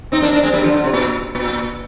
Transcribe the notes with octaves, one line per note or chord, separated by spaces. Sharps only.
C4 D#4
A#3 D4
A#3 D4
G#3 C4
G3 A#3
D3 F3
D3
C3
A#2
A#2